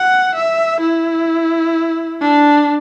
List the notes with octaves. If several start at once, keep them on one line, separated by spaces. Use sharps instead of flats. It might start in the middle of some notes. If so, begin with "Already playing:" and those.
Already playing: F#5
E5
E4
D4